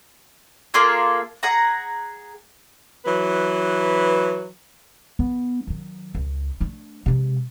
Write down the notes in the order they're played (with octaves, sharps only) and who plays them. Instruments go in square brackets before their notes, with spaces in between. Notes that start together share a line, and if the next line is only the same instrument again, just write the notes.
[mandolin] A#3 F4 G#4 A4
G#4 F#5 A#5
[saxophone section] E3 F#3 B4
[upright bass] B3
D#3 F#3
C#2
A3 D4
C3 G#3